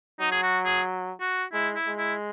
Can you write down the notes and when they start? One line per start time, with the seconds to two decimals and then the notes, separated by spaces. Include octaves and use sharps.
0.20 F#3 D#4
0.32 G#4
0.43 F#4
0.65 G#4
1.21 F#4
1.53 G#3 E4
1.76 E4
1.87 G#3
1.98 E4